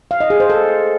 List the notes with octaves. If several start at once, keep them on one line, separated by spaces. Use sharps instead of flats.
F5
D#5
G#4
C5
A4